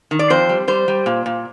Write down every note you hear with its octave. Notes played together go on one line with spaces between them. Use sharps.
D#3
D5
F2 C5
G3
G3 C5
G3
A#2
A#2